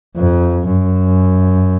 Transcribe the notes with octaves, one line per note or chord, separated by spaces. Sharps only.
F2
F#2